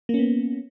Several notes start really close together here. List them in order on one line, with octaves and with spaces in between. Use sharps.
A#3 C#4 B3